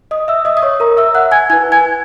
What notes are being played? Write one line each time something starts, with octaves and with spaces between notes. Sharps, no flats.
D#5 D#6
E5 E6
D#5 D#6
D#6
C#5 C#6
A#4 A#5
E5 E6
F#5 F#6
G#5 G#6
E4 B4 G#5 G#6
G#5 G#6